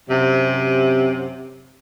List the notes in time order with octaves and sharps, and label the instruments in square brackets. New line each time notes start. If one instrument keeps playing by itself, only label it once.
[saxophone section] F#2 C3